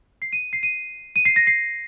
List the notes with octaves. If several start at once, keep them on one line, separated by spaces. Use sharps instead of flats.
C7
D#7
C7
D#7
D#7
C7
A#6
C7